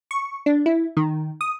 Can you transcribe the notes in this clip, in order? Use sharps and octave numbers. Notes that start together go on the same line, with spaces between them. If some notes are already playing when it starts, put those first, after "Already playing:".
C#6
D4
E4
D#3
D#6